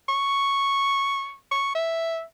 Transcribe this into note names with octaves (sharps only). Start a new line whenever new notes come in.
C#6
C#6
E5